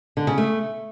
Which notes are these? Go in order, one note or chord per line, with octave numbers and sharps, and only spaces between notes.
D3
C#3
A3